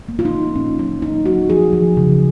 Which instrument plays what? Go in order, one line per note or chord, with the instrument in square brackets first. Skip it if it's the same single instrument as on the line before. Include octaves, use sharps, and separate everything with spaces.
[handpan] A#3
F4
D#4
A#3
A#2 C#4
F#3 C#4
A#3 D#4
F#3 F#4
F3 G#4
F3
C#3